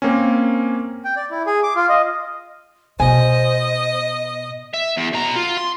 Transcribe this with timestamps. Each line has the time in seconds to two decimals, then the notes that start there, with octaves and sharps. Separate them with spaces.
0.02 A#3 C4 C#4
1.05 G5
1.16 D5
1.31 E4
1.46 G#4
1.63 D6
1.75 F4
1.89 D#5
3.00 B2 C5 D#5 G#5
4.74 E5
4.97 E2
5.13 B2 A#5
5.36 F4
5.58 C6